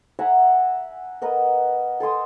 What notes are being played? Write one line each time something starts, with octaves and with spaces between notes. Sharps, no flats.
E5 F#5 G#5 A#5
B3 A#4 D#5
A4 G#5 C6 D#6